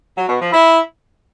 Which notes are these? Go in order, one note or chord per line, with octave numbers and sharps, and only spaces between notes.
F#3
B2
F3
E4